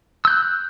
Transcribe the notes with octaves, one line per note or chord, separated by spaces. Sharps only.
E6 F#6 G6